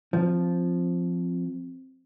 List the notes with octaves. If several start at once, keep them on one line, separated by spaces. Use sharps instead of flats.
F3 C4